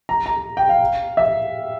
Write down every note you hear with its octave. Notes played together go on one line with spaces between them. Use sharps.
A#5
A#5
G5
F5
E5